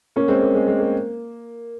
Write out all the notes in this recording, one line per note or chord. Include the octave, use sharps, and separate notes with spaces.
A#3 C#4
G#3 C4
A#3
G#3
G#3
A#3